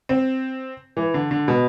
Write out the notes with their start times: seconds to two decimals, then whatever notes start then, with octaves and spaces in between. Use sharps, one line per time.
0.09 C4
0.97 E3
1.14 D3
1.31 D3
1.48 B2